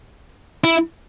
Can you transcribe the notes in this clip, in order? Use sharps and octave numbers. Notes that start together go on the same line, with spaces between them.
E4